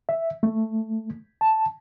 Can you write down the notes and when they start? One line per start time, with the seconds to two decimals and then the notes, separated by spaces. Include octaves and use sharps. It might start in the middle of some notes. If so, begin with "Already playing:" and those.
0.09 E5
0.43 A3
1.41 A5